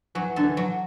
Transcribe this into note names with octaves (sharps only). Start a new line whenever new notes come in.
E3 F#3
D3 A4
E3
F#3